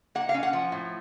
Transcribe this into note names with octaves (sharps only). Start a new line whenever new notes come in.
A#3 F#5
F5
C#4
F#5
F3
A2